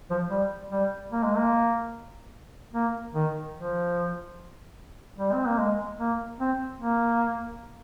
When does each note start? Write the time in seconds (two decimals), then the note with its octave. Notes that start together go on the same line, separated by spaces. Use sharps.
0.10 F3
0.30 G3
0.71 G3
1.12 A#3
1.23 G#3
1.36 A#3
2.74 A#3
3.15 D#3
3.56 F3
5.18 G3
5.33 C4
5.46 A#3
5.58 G#3
5.99 A#3
6.40 C4
6.80 A#3